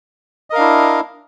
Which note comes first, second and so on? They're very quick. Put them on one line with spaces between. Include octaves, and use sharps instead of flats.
D#5 A#4 F5 D4 E4